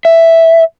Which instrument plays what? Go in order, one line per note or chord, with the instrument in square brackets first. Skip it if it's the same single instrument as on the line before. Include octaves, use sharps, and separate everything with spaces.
[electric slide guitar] E5